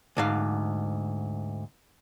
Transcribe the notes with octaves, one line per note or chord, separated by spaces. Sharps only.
D2 G#2 F5